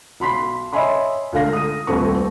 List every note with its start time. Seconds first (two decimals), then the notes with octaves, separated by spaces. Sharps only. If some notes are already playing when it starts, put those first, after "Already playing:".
0.20 B1 B5 C6 B6
0.73 C#5 D#5 E5 G#5 B5 C6
1.33 C#2 D3 A3 F5 A#6
1.53 D#6 D#7
1.87 D#1 C2 A3 C4 B4 C#6